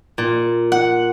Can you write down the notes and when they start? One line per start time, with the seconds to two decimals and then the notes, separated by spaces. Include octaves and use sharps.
0.18 A#2
0.72 F#5